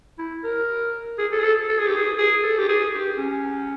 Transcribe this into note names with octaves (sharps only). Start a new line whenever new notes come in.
E4
A#4
G#4
A4
G#4
A4
A4
G#4
G4
G#4
G#4
A4
G4
G#4
G4
C#4